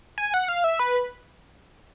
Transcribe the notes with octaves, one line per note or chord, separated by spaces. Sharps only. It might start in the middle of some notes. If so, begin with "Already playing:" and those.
G#5
F#5
F5
E5
B4